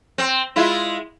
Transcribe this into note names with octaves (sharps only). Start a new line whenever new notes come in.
C4
G#3 E4 F4